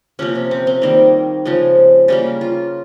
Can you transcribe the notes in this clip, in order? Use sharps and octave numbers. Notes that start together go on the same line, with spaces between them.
C3 F3 A#3 C#4
C#4
C4
C4
D#3 G3 A#3
C#3 F3 G#3
C#3 G3 A#3 C#4
F4